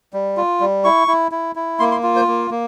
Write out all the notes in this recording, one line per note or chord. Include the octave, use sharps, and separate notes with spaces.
G3
F4
G3
E4 C#6
E4
E4
E4
A#3 C6
C6
F4
C5
A#3
A#3